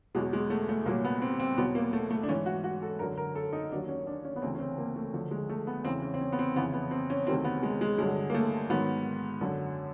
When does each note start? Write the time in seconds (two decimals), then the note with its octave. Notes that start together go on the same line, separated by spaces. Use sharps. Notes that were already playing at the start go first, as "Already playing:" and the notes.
0.15 E2 B2 F#3 G#3
0.33 G#3
0.50 A3
0.69 A3
0.86 C2 A#2 F#3 A#3
1.05 B3
1.22 C4
1.40 C4
1.58 E2 B2 F#3 B3
1.75 A#3
1.93 A3
2.11 A3
2.23 D4
2.28 G#2 E3 C#4
2.46 F#4
2.64 F#4
2.82 A4
2.99 F#2 D3 F#3 A#4
3.18 A#4
3.35 A4
3.53 D#4
3.71 D#2 D#3 F#3 D4
3.89 C#4
4.07 D4
4.25 C#4
4.36 B3
4.42 D2 C#3 E3 C4
4.55 C#4
4.60 C4
4.78 A#3
4.96 A3
5.13 D2 D3 F3 A3
5.31 G#3
5.49 A3
5.67 B3
5.85 E2 C#3 E3 C4
6.02 C#4
6.14 C4
6.21 C#4
6.33 B3
6.39 C4
6.56 F2 C#3 E3 B3
6.74 B3
6.91 C4
7.10 C#4
7.27 D2 C3 D#3 F#3 C4
7.44 B3
7.63 G#3
7.81 G#3
7.98 G2 D3 F#3 G#3
8.30 A#3
8.34 A3
8.69 G#2 D#3 F#3 B3
9.41 F#2 D3 F#3